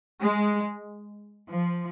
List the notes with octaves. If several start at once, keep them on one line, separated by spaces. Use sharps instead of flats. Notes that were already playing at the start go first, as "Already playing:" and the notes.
G#3
F3